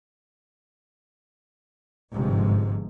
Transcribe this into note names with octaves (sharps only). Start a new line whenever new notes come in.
G1 G#2 C3 F3 G#3